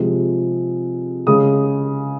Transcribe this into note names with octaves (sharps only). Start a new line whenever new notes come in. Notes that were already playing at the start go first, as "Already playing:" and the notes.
Already playing: C3 F3 G#3
C#3 G#3 D#6